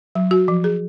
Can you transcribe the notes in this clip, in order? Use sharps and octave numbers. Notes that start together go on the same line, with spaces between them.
F#3
F#4
F3
G#4